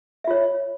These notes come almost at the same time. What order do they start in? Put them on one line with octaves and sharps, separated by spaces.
E5 F4 C#5